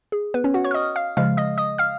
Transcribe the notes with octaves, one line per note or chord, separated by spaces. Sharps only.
G#4
B3 B4
C#4 C#5
F#4 F#5
C#5 C#6
F6
D#5 D#6
F5 F6
C#3 F3 G#3 F5 F6
D#5 D#6
D#5 D#6
F5 F6